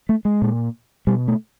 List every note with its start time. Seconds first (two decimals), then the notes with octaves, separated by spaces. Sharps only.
0.09 A3
0.25 G#3
0.42 A#2
1.07 B2 G3
1.28 A3